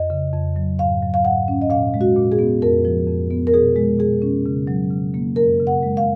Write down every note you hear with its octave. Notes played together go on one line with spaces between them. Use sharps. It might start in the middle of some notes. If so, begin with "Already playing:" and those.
Already playing: F2 D#5
C#3
F2
F#3
G#2 F5
F#3
F5
G#2 F#5
C#4
D#5
A#2 F5
G#3
F#4
A#2
G#4
B3
F2 A#4
F3
F2
B3
A#4
B2 G#4
G#3
B2 G#4
C#4
C#3
F#3
C#3
A#3
F#2 A#4
C#3
F#5
G#3
F5